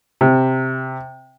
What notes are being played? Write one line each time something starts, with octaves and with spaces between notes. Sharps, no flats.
C3